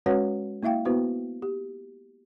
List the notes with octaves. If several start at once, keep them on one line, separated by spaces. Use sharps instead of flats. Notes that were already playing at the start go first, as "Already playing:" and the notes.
G#3 C#4 F#4 B4 C#5 F#5
A#3 E4 E5 F5 G5
B3 E4 F#4 B4 C5
G4